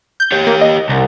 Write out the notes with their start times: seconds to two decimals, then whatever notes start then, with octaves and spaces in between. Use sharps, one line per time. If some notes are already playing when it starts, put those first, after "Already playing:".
0.20 G6
0.32 G4 C#5
0.47 A#3
0.61 D#5
0.89 C2